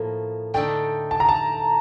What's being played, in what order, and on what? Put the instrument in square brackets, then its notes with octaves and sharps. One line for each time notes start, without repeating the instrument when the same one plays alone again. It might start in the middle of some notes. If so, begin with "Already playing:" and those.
Already playing: [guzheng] A2 F3 A#3
[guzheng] D3 A3 D#4 A4 D5 [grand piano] G5
[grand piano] A5
A#5
A5